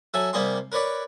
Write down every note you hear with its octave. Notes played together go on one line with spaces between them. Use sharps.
F#3 A4 E5 G#5
C3 G3 A#3 G#4 C6
A#4 B4 C#5 D5 B5